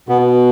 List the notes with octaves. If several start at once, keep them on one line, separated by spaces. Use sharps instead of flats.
B2 B3